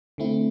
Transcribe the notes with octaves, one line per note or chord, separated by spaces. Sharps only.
D3 A3 C4 E4